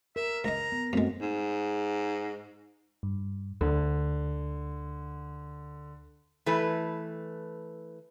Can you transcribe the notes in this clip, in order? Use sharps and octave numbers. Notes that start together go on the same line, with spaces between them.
A#4 E5
C#2 D#5 A#5
B3
F#2 G#3 A3 C4 F#4
G#2
G2
D2 D3
E3 A3 B4